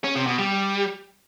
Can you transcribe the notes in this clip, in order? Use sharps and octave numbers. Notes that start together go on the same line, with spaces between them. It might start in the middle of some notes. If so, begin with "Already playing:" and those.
C#4
C3
B2
G3